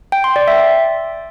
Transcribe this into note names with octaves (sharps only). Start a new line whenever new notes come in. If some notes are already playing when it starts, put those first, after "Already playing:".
G5
C6
D5
E5